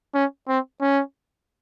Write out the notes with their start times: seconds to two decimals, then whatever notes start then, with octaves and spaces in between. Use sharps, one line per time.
0.14 C#4
0.48 C4
0.81 C#4